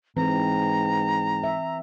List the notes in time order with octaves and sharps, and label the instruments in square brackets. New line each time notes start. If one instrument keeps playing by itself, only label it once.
[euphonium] G#2 [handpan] E3 C4 [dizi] A#5
[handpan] E5